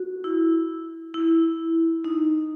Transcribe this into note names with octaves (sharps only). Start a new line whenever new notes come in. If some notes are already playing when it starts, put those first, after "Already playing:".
Already playing: F#4
E4
E4
D#4